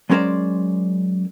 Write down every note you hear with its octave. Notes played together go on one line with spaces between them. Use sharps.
F#3 G#3 C#4 A#4 C5 D5